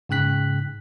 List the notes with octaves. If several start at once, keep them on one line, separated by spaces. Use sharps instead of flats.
G#2 C#3 G5 F#6 B6